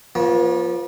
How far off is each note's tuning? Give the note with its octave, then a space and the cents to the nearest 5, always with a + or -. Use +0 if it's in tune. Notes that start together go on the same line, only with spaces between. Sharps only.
F3 +0 B3 -45 C#5 +0